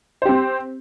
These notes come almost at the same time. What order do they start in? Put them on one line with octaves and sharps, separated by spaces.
C5 G4 C4